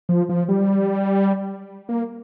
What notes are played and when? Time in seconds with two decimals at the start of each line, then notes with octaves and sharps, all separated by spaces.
0.09 F3
0.29 F3
0.49 G3
1.89 A#3